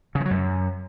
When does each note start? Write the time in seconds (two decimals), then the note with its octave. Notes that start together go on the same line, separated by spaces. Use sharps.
0.15 C#3
0.20 F3
0.25 F#3
0.31 F#2